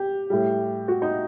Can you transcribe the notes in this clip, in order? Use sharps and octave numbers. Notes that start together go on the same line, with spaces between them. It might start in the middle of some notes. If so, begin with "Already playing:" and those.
Already playing: G4
A2 G3
F#4
D#4